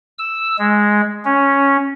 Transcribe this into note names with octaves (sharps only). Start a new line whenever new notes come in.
E6
G#3
C#4